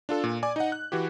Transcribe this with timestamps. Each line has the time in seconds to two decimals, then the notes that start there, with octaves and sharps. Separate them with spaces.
0.09 D4 F4 A4
0.24 A#2
0.43 D5 G#5 D6
0.56 D#4 D#5 F#5
0.72 F#6
0.92 E3 F#4 G4